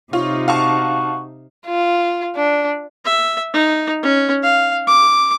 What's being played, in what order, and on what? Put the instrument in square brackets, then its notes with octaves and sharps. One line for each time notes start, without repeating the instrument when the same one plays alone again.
[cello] C3 D#4 [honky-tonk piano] F4 [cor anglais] C#5
[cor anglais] F#4 [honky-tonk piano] F5 A5 C#6
[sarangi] F4
D4
[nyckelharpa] E5
D#4
C#4
F5
D6